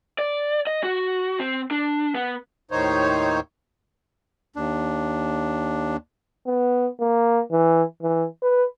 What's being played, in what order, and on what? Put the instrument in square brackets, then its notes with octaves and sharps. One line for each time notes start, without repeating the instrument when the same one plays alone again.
[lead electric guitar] D5
D#5
F#4
C4
D4
B3
[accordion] D#2 A2 D#3 D#4 C5 C#5
[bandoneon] D#2 D4
[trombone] B3
A#3
E3
E3
B4